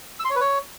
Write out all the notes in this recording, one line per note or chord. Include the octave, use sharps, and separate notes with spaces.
E6
C6
C#5
B4
C#5